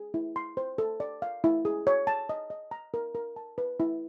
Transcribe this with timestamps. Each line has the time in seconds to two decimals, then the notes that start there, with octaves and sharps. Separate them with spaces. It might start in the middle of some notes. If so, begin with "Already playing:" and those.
Already playing: G#4
0.14 E4
0.36 C6
0.57 C5
0.78 A4
1.00 D5
1.22 F5
1.44 E4
1.65 G#4
1.87 C#5
2.07 A5
2.29 D#5
2.50 D#5
2.71 A#5
2.94 A#4
3.15 A#4
3.36 A5
3.58 B4
3.80 E4